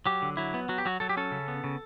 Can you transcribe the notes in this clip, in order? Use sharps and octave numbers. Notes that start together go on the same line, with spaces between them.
F#3 G4
D3
F#3 E4
B3
F#3 F#4
G4
F#3 F#4
F#3 A4
G4
C#4 A4
C#3
B3
C#3